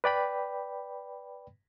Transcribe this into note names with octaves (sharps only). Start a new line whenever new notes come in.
B4 D5 G5 B5